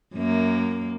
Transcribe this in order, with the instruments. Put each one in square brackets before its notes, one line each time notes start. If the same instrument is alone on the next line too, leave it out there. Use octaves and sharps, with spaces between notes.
[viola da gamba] F#2 A#3